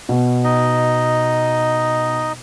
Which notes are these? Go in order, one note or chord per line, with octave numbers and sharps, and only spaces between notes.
B2
D#4 D#5